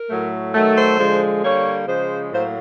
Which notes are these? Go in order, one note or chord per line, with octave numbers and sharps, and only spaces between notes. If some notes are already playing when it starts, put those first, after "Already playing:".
Already playing: A#4
A2 F#3 A3
D#3 F#3 A3
C5
D3 F3 G#3
D3 G3 A#3 C#5
C#3 F3 G#3 C5
A2 F#3 A#3 C5